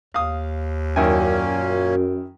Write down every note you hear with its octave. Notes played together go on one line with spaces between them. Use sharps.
D#2 F5 D#6
F#2 A#2 D#3 A#3 C#4 E4 G#5